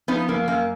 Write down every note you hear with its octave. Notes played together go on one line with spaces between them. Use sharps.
F3 B3 D#4
F#2 A#3
F#2 A#3